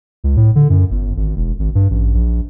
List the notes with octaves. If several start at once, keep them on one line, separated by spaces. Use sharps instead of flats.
C#2
A2
D3
F#2
G1
G#1
E1
G#1
G2
A1
A#1